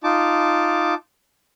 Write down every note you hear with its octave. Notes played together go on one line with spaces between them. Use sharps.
D#4 F4 A5 D6